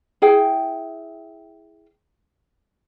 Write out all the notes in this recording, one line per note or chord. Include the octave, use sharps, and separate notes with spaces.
E4 G#4 G5